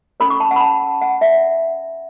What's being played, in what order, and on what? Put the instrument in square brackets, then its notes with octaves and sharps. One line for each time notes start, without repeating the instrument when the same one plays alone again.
[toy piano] C#4 A4 C#5 B5
C#6
A5
F#5
B5
A5
F#5
E5